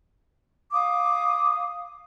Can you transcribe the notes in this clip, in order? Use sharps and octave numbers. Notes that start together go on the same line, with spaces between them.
F5 D6 D#6